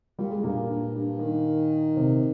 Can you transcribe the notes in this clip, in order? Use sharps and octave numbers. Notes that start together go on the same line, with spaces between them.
A#2 G3
G#3
G2 A#2 A#3
G2
G2
D#3
C3 C4